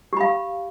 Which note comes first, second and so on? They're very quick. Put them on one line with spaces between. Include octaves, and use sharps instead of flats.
G4 B5 F5